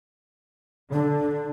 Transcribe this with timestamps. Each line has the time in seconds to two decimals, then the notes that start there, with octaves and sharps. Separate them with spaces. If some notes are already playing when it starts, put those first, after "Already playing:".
0.93 D3 D4